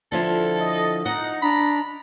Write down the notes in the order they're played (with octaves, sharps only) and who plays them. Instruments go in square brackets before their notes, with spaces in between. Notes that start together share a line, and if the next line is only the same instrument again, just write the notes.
[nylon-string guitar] D3 F3 E4 [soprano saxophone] A4
[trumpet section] D#5
[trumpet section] D#4 [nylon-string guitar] D#5 [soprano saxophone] F#5
[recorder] D4 [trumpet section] A#5 [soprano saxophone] B5